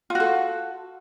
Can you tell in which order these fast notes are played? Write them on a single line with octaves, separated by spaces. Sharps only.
F4 F#4 A4